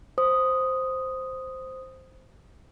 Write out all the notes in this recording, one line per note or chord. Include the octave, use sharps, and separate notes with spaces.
C5 D#6